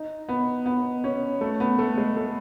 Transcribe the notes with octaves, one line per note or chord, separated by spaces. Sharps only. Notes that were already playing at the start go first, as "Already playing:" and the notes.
Already playing: D#4
B3
B3
C#4
A3
B3
A3
G#3
A3